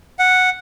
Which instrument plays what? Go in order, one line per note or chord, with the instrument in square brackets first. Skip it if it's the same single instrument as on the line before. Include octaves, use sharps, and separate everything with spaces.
[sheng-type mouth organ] F#5